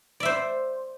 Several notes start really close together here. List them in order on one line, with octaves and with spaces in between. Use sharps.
D5 E5 C5